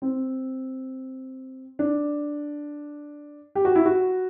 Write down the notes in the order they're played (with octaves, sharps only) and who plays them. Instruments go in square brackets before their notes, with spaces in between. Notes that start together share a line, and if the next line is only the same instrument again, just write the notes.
[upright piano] C4
D4
G4
F#4
E4
F#4